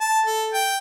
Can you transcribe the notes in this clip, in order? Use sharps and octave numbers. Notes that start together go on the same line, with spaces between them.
A5
A4
G5